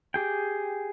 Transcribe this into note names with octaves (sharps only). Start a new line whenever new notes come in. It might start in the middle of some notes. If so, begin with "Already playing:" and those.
G4 G#4 G5